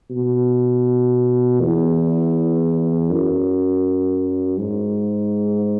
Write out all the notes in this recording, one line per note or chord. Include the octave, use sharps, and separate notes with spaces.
B2
E2
F#2
G#2